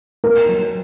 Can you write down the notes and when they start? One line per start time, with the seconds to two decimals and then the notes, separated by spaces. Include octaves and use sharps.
0.24 A#3 A#4
0.49 F#3